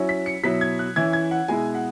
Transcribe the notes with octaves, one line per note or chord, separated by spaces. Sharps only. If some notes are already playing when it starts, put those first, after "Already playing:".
Already playing: F#3 C#4 E4
B6
C#7
B2 F#3 E4 B6
G#6
F#6
E3 C#4 E4 G#6
G#6
F#5
B2 G#3 E4 G#5
F#5